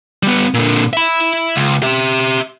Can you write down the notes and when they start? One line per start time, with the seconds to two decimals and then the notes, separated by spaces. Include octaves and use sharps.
0.23 G3 B3
0.54 A#2 D3
0.93 E5 B5
1.56 C#2
1.82 G4 E5